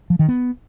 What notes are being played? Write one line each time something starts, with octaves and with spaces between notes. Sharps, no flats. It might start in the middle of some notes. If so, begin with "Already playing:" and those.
F3
D#3
B3